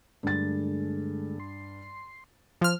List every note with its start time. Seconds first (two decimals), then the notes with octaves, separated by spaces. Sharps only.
0.23 G2 D3 G#3 A3 A6
1.40 C6
2.61 F3 F6